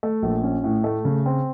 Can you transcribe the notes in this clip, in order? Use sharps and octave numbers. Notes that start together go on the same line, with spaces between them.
A3
A#1
C#4
A2
A3
C#3
C4